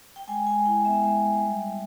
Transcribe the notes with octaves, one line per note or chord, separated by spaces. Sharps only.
G5
G#3 G#5
G#3 G#5
E4 G5
B3 E5
G#3
G#3
G3
G3